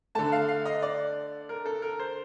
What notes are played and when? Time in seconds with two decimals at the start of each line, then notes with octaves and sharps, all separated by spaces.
0.15 D3 A3 A5
0.32 F5
0.48 F5
0.65 D#5
0.83 D5
1.49 A#4
1.66 A4
1.82 A#4
1.99 C5